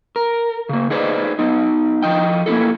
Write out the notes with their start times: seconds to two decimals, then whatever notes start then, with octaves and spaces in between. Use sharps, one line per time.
0.16 A#4
0.69 C#3 A#3
0.90 D#4 G#4 B4 C5 D5 D#5
1.39 B3 D#4
2.02 F3 D#5 G5
2.46 A#3 C#4 E4 A4